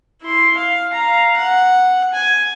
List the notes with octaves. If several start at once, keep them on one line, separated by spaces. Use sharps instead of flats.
E4 C6
F5
F5 A#5
F#5
G#5